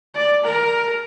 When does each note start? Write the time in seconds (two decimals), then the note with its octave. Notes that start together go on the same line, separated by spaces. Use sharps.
0.15 D5
0.44 A#4